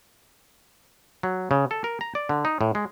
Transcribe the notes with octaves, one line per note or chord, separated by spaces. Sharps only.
F#3
C#3
A4
A#4
A#5
D5
D3
D#4
A2
G#3